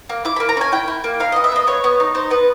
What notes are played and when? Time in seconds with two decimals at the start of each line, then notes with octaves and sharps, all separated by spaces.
0.09 A#3
0.25 E4 D6
0.36 A#3 B5
0.49 A#5
0.57 C#4 G#5
0.72 E4 G5
0.88 E4
1.04 A#3
1.20 D#4 F5
1.32 B3 D#5
1.44 E5
1.52 B3 D#5
1.67 B3 C#5
1.84 B3
2.00 D#4
2.15 D#4 C5
2.30 B3 B4